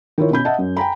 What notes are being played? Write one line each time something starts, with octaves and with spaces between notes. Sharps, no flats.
D#3 E4 F4 C#5
B2 C#4 B5 G6
D#5 E5 F#5 A5
F#2
G5 G#5 A#5 B5